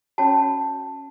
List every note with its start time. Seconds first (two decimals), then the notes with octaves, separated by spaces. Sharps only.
0.18 C#4 F#4 C#5 A5